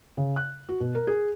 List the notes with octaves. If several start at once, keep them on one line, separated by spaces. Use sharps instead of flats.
C#3
F#6
F#4
B2
A#4
G#4